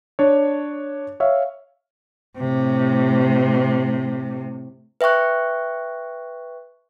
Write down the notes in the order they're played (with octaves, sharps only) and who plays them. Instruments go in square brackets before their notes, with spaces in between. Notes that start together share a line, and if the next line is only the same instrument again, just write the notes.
[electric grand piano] D4 C#5
C#5 E5 F5
[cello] A2 C3
[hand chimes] B4 E5 G5 C#6 F#6